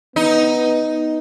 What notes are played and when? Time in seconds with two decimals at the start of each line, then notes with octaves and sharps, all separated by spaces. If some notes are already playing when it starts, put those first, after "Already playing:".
0.16 B3 D#4